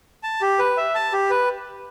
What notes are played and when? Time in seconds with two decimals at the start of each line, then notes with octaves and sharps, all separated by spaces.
0.23 A5
0.41 G4
0.59 B4
0.77 E5
0.95 A5
1.12 G4
1.30 B4